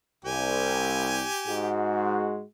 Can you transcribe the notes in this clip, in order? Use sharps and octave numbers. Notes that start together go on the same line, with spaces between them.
C2 G4 G#5
G#2 G#3 F#4